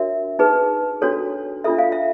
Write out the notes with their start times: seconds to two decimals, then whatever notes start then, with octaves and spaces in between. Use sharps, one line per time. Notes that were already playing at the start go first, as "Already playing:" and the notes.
Already playing: D4 F#4 A#4 C#5 E5
0.39 D#4 G#4 B4
1.02 D4 F#4 A4 C#5
1.64 D4 F4 A4 E5
1.78 F5
1.92 E5